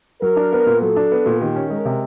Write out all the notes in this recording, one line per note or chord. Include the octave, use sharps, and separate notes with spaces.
F#3 A#4
D4
B3
A#2
F#3 A4
D4
B3
A#2
D#3 G4
C#4
G#3 A#4
C3